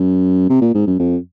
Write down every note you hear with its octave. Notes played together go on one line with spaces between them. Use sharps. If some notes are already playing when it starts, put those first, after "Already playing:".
Already playing: F#2
C3
A#2
G#2
F#2
F2